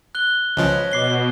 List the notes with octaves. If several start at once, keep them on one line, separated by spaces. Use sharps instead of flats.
F#6 G7
C#2 C#3 F3 B4 C#5 D#5
B2 D6 C7 G7